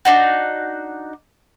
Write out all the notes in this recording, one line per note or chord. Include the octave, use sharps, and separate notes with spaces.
D4 D#4 F#4